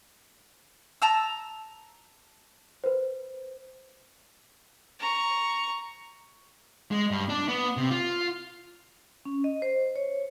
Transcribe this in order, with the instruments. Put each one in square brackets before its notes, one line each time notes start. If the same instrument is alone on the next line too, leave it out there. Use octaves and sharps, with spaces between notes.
[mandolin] A5 A#5 E6
[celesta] B4 C5
[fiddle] A#5 C#6
[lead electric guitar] G#3
G2
D4
B3
C3
F4
[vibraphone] C#4
D#5
C5
C#5